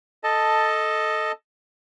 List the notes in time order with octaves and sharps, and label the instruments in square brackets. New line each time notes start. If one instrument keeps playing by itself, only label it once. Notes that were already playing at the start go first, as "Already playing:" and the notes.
[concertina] A4 D#5 A5